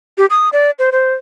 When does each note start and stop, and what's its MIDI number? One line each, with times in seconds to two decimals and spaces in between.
0.18 0.26 67
0.30 0.49 87
0.53 0.71 74
0.79 0.90 72
0.92 1.14 72